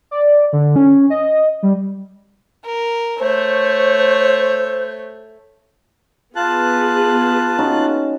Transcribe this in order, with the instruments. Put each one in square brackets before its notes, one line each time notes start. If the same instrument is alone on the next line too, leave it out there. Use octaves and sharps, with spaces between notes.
[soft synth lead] D5
D3
C#4
D#5
G3
[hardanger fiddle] A#4
[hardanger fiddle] A3 C#5 [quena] C5
[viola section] B3 G#4 B4 [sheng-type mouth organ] F4 A5 F#6
[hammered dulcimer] C#4 D#4 F#4